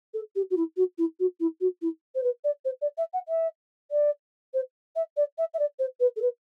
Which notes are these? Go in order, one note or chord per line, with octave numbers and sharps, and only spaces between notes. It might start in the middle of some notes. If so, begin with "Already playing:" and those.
A4
G4
F#4
E4
F#4
E4
F#4
E4
F#4
E4
C5
B4
D5
C5
D5
E5
F#5
E5
D5
C5
E5
D5
E5
E5
D5
C5
B4
A4
B4